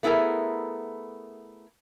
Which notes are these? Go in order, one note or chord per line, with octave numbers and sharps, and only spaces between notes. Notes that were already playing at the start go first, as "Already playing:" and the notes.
A3 B3 E4 G#4 A#4